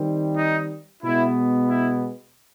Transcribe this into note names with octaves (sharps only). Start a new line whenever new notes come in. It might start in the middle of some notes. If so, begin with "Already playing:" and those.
Already playing: D#3 G3 C4
D#4
B2 G#3 B3 E4
E4